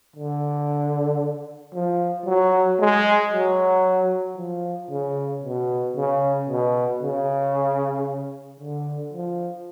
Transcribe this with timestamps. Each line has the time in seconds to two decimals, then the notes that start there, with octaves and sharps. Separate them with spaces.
0.16 D3
1.74 F3
2.26 F#3
2.80 G#3
3.32 F#3
4.38 F3
4.91 C#3
5.43 B2
5.97 C#3
6.49 B2
7.02 C#3
8.60 D3
9.14 F3